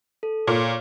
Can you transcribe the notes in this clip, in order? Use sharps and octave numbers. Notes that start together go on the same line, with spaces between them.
A4
A#2 C#5 F5 F6